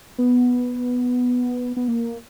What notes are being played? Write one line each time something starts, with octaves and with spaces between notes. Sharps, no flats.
B3
B3
A#3